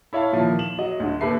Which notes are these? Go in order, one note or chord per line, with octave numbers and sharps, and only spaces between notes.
E4 C#5 E5 F5 A5 B5
A#2 D#3 F3
E7 F#7
F#3 D#5
D2 D3
D#2 G4 A4 B4 E5 C7